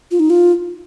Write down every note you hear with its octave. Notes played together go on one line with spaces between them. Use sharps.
F4
D#4
F4